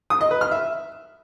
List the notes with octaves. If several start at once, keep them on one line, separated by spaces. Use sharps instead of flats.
D#6
D#5
B4
F6
E5